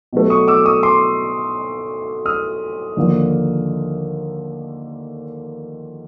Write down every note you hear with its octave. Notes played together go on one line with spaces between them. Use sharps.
B2 F#3 A3
C#6 D#6
D6 E6
C#6 D#6
C6 D6
D#6 F6
D#2 D3 F3 A#3